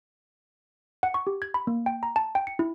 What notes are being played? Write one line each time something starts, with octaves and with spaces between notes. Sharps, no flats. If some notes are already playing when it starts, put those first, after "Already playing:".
F#5
C#6
G4
G#6
B5
A#3
G5
A#5
A5
G5
C#7
E4